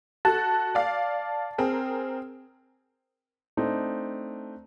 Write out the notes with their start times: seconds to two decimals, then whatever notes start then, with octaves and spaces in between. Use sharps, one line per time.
0.25 F#4 A4 A5
0.75 D5 F5
1.58 C4 G#4 A#4
3.57 A3 C4 D4 D#4